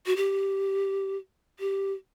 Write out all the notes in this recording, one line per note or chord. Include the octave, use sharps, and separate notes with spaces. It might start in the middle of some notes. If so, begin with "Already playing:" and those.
F#4
G4
G4